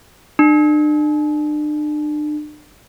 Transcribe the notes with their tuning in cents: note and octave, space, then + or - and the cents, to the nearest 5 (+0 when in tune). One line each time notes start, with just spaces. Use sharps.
D4 +40